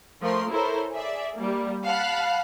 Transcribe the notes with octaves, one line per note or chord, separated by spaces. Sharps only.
F3 A3 A#4 C6
E4 A4 A#4 C5 C#5
G#4 D5 E5
G3 A#3
F5 F#5 A5 B5 F#6